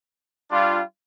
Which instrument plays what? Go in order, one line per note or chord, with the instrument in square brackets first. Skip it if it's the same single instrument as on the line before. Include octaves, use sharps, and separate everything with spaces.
[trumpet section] G3 D4 F4